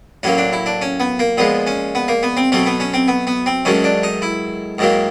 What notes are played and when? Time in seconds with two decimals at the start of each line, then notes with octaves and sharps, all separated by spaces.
0.23 A2 F#3 A#3 C#4
0.38 D4
0.53 E4
0.66 D4
0.81 C#4
1.00 B3
1.19 A#3
1.37 A#2 F3 G#3 B3
1.67 C#4
1.95 B3
2.08 A#3
2.23 B3
2.37 C4
2.52 B2 F#3 A3 C4
2.66 B3
2.80 C#4
2.94 C4
3.08 B3
3.27 B3
3.46 C4
3.65 G#2 D#3 F#3 A3 C#4
3.84 D4
4.03 D#4
4.22 E4
4.78 G#2 D#3 F#3 A#3